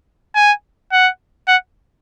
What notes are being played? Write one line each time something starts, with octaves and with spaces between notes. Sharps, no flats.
G#5
F#5
F#5